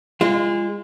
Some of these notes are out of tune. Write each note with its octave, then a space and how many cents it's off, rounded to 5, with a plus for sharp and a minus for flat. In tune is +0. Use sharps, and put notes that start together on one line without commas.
G#3 -30 F4 -25